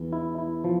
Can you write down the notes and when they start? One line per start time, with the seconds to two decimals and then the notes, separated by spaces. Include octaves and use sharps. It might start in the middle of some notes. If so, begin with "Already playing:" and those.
Already playing: E2
0.13 E4
0.38 E4
0.64 F3